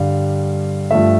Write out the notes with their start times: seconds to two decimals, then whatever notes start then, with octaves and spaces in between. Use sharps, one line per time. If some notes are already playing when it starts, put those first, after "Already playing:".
Already playing: G2 D3 G3 F5
0.91 G2 F3 A3 E5